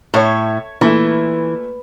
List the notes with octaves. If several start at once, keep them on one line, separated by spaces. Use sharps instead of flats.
A2 C#5 E5
A#2 E3 A3